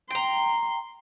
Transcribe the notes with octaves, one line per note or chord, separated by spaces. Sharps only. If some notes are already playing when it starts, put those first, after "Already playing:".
G5 A#5 C6